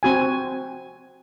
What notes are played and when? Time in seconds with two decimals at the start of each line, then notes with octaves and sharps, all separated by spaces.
0.03 C4 F#4 G#5